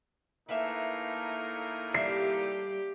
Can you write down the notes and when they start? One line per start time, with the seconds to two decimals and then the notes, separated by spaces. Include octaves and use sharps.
0.49 A2 A#3 D#4 B4 E5 G#5
1.94 G3 G4 E5 C7